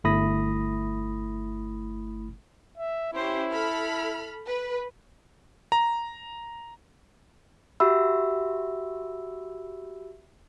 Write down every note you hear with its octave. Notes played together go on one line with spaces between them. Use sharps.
G1 A3 E4 B5 D#6 A#6
E5
C#4 E4 G4 C5
A4 B5 F6
B4
A#5
F#4 G4 E5 B5 E6